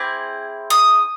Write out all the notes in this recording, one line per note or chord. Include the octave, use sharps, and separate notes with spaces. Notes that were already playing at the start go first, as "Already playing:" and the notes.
Already playing: C4 E4 G#4 D6
D#6